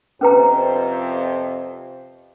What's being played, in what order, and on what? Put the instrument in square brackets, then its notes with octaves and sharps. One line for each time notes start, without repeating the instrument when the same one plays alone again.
[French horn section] F2 C3 C5 [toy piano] C#4 B4 A#5